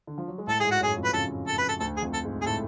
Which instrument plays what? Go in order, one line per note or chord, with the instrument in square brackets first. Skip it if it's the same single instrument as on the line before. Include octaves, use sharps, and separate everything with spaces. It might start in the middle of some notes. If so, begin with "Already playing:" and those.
[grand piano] D3
F3
F#3
G#3
[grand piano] A2 A3 [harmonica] A4
[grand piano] A3 [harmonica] G#4
[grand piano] G#2 G#3
[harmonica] F#4
[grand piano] F#2 F#3 [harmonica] G#4
[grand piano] F2 F3
[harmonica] B4
[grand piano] C#3 [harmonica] A4
[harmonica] A4
B4
A4
[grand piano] D2 D3 [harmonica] A4
[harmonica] G#4
[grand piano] F2 F3
[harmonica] A4
[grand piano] G#2 G#3
[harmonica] G#4
[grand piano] A2 A3 [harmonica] A4